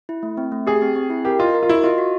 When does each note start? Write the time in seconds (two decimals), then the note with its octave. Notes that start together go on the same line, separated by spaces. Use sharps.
0.09 E4
0.23 A3
0.37 C4
0.52 A3
0.67 G4 G#4
0.82 C4
0.96 C4
1.10 E4
1.25 G4 A#4
1.39 F4 D#5
1.54 A#4
1.63 F4
1.69 E4 F#4
1.83 F4 D#5
1.98 F#4